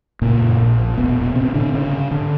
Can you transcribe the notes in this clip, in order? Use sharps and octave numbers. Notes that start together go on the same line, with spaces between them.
A#2 C#3 A#3
F#2
A#1
A#2
E1 B2 B3
E1
A2 C3 C4
A2 D3 D4
G1 C#3 C#4
C#3
G#2 D3 D4